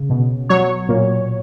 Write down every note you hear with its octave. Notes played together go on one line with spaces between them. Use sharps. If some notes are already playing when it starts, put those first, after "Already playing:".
Already playing: C#3
B2
F#3 C#5
A#2